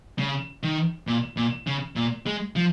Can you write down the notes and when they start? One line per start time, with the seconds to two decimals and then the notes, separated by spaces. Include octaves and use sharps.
0.19 C#3
0.63 D#3
1.07 A#2
1.37 A#2
1.67 C#3
1.96 A#2
2.26 G#3
2.56 F3